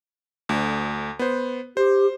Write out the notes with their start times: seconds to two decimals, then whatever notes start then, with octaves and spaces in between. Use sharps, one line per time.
0.49 D2
1.19 B3 C5
1.77 G4 C5